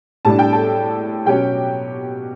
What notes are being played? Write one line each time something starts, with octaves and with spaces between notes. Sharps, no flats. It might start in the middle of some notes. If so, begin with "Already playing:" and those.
A2 G3 D4 A5
G5
A4 A5
B2 F#3 C#4 G4 G5